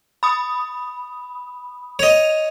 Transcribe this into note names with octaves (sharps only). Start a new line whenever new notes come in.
B5 D#6
C#5 D#5 F7